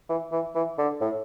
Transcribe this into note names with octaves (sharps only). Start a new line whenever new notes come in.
E3
E3
E3
D3
A2